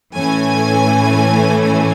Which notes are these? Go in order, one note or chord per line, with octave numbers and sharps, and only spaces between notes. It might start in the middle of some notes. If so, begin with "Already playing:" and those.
A2 E3 A3 C#4 G#5
G#5